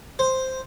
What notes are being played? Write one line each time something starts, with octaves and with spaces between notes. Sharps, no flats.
C5